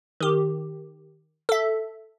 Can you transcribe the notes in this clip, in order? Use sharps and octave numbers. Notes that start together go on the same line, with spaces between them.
D#3 G4
A4 E5